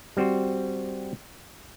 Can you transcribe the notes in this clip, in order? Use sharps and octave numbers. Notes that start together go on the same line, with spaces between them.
G3 C4 F#4 C5